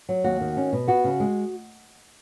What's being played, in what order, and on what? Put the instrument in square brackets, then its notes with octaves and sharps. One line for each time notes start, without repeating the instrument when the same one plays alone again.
[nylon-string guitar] F#3
D#2 F#4
D#3
C#4
B2
B3 F#4
C#3
G#3